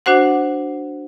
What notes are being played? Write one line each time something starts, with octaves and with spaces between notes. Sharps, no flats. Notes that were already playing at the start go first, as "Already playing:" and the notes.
D4 F#4 C5 F#5